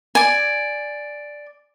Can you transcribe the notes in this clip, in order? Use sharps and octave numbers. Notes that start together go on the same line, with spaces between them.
D5 G#5